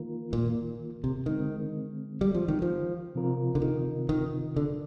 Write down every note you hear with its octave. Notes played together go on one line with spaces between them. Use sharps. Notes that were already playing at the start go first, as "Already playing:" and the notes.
Already playing: D#3 A#3 F4 A#4
A#2
C3
D3 D#3 G#3 C4
G3
F3
D#3
F3
C3 F3 C4 F4 A#4
D3
D#3
D#3
D3